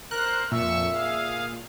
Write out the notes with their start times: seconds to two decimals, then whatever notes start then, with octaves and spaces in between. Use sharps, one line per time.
0.11 A#4 C5 F#6
0.52 F2 A#2 E5 C#6 E6
0.91 G#4 F5